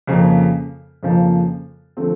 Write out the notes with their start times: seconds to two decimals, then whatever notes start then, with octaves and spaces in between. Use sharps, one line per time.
0.07 F2 C#3 F3 A#3
1.03 F2 C#3 F3 A#3
1.97 D3 F3 A3 C4